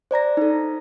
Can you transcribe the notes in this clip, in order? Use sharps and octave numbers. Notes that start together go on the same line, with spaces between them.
C5 D5 A#5 A#6
D#4 A4